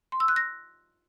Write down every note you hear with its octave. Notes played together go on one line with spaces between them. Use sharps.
C6
E6
F#6
A#6